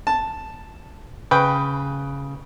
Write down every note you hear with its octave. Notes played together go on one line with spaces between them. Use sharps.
A5
C#3 B4 G5